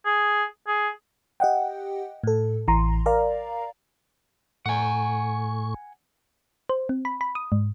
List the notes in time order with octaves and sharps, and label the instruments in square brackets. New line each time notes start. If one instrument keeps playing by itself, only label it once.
[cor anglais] G#4
G#4
[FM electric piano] G4 D#5 F#5 G5
A2 A4
A1 E3 A#5 C6
A#4 D5 F5 A#5
[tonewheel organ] A2 C#6 [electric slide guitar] F#5 G#5
[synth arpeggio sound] C5
C4
B5
B5
D#6
G#2